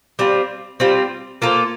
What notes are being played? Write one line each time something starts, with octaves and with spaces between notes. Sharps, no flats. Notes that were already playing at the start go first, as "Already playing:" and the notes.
G3 C4 F4
G3 C4 F4
A#3 F4 A4 C5